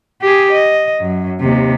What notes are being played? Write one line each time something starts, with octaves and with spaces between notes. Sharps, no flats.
G4 G#4
D#5
F#2
D#2 C3